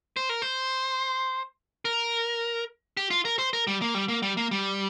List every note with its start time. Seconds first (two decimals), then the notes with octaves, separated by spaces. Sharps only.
0.17 C5
0.29 A#4
0.42 C5
1.85 A#4
2.97 G4
3.11 F4
3.25 A#4
3.39 C5
3.53 A#4
3.67 G3
3.82 A#3
3.94 G3
4.08 A#3
4.22 G3
4.37 A#3
4.51 G3